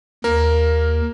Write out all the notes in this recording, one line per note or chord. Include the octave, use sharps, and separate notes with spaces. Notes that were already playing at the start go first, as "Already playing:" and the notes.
D#2 A#3 A#4